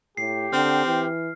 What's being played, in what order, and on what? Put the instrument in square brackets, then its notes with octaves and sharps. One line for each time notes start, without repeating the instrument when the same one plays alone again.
[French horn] A2 [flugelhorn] G4 [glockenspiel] C7
[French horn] D3 [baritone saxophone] C4 [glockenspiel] F6
[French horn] E3